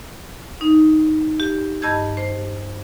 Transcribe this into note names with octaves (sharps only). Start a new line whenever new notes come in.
D#4
G4
G2 D#5 A5 E6 G6 G#6
C5